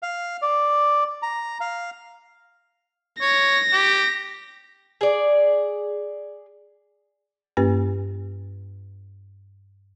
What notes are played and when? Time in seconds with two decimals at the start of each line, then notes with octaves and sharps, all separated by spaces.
0.03 F5
0.42 D5
1.22 A#5
1.61 F5
3.21 C#5 A#6
3.72 G4
5.01 G#4 D5
7.57 G2 A#3 C#4 G4 B4